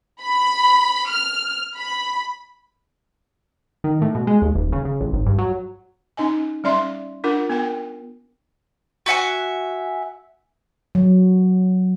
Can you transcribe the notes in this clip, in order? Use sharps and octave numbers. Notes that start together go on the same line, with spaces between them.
B5
F6
B5
D#3
A2
B2
G#3
D#2
D#1
C#3
C#3
A1
G#1
G2
F#3
C#4 D#4 D#5 G#5
G3 C#4 D5 E5 C6
D4 F4 A#4 F#5
B3 A#4 G5
F#4 E5 F#5 G#5
F#3